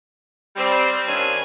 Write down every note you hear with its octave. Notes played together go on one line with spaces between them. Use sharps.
G3 C4
G2 D#3 C#4 D4 F4 G#5